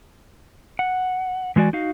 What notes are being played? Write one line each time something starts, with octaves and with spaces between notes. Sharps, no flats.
F#5
E3 G#3 F#4 D5 G#5
D#4 F#4 F5